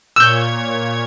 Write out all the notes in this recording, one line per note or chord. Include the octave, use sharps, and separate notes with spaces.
A#2 C#5 E6 G6 G#6